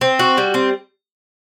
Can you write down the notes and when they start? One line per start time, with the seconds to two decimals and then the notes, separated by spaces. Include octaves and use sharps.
0.01 C4
0.19 F#4
0.38 G3
0.54 C4